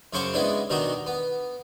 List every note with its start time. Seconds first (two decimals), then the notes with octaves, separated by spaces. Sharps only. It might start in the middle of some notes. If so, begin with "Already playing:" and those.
0.13 F#2 C#3 C#4 C5 C#6 D6
0.34 G#3 B3 C#4 D4 E4
0.70 B2 D#3 D4 D#4 F#4
1.06 B3